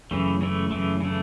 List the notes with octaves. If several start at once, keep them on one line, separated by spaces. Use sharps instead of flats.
F#2 C#3 E3 A3
C#3 E3 A3
F#2 C#3 E3 A3
C#3 E3 A3